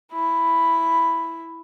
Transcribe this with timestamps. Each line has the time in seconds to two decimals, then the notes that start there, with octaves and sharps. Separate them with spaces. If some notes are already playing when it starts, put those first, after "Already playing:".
0.12 E4 B5